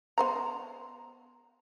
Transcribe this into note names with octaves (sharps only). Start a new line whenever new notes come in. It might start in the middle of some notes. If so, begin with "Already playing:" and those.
B3 C5 A#5